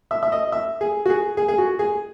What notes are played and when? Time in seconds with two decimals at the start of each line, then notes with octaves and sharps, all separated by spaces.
0.11 E5
0.23 E5
0.32 D#5
0.52 E5
0.81 G#4
1.06 F#4
1.10 G#4
1.37 G#4
1.48 G#4
1.58 F#4
1.79 G#4